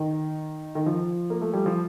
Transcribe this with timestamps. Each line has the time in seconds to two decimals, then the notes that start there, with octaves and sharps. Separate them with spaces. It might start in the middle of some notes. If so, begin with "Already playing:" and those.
Already playing: D#3
0.75 D#3
0.86 F3
1.30 A#3
1.42 A3
1.53 G3
1.66 F3